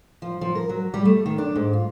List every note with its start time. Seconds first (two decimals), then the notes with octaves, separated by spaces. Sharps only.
0.22 F3
0.41 F3
0.55 A#4
0.69 F#3
0.94 G3
1.05 A3
1.26 D#3
1.38 D4
1.55 G#2
1.73 F4